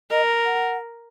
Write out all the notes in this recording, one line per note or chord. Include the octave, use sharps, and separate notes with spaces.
A#4 D#5
F#5